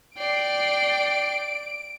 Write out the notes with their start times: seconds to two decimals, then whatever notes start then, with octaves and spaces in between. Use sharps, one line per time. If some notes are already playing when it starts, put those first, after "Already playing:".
0.18 D5 G5 C7 D7